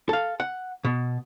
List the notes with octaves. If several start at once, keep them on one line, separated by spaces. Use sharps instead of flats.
A4 F5
F#5
B2